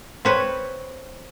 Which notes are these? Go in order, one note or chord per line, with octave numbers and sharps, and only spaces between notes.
C4 B4 C#5